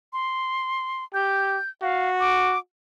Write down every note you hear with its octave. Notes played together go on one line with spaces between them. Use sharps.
C6
G4 G6
F#4 F5
D6